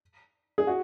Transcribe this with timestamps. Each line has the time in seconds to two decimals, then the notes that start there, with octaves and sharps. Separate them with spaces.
0.58 G#4
0.67 F#4